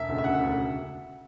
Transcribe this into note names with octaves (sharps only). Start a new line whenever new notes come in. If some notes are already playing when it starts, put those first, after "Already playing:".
Already playing: E1 E5
D2 C#3
E5
E1 F#5
D2 C#3